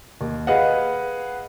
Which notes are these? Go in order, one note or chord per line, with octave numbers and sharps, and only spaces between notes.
D#2
G#4 B4 D#5 F5 F#5